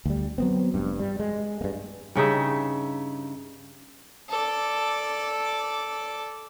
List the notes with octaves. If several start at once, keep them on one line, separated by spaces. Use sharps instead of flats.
D2 G3
F#3 B3 C4
F1 G2
G3
G#3
G2 A#3
G2 C#3 D#4 E5
A4 D5